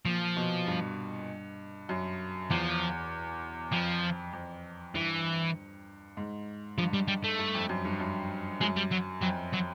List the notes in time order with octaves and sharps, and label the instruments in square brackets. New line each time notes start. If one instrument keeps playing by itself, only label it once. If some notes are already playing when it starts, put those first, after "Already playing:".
[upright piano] A#2 [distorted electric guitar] F3
[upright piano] B2
G2
F#2
[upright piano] E2 [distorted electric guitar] F3
[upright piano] F2 [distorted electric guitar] F3
[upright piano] F2
[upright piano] G2 [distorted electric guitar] E3
[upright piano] G#2
[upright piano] G2 [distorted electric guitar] F3
[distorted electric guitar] G3
G3
A3
[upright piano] G2
F2
F#2
G2
F#2
[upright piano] F#2 [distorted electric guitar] G#3
[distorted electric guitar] G3
F#3
[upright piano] F2 [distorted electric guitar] F#3
[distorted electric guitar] F#3